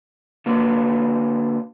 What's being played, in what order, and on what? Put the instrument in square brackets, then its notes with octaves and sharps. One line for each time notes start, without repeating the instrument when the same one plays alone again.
[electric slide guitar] D3 A#3 F#4 B4